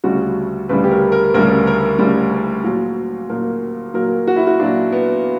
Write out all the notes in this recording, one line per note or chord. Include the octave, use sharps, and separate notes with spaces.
D2 C#3 G3 F#4
D2 C#3 G3 B4
G4
A#4
A#4
D2 C#3 G3 A#4
A#4
D2 C#3 G3
A#2 F#3
A#2 F#3 A#4
A#2 F#3 A#4
F#4
E4
F#4
A#2 F#3 D4
B3